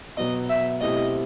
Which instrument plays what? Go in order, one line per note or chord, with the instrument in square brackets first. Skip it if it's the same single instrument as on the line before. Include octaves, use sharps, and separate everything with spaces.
[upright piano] B2 F#3 B3 [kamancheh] D#5
[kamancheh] E5
[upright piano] B2 A3 C4 E4 G4 [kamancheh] D#5